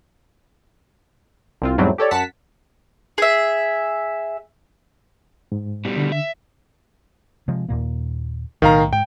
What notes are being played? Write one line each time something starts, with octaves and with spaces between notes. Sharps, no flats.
C2 C4 F4
E2 G#2 F#3 G3 A3 C4
G4 A4 C#5 D5
F#2 F#5 A5 B6
G#4 E5
G#2
B2 G3
D3
E5
C3 F3 G#3
D#2 A#2 A#3
B1 A2 D#3 F5 A#5
G#2 G5